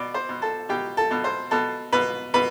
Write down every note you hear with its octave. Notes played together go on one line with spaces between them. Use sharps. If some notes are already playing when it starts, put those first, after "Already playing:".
Already playing: B2 D5
C5
B2
A4
B2 G4
A4
B2
C5
B2 A4
B2 B4
B2 B4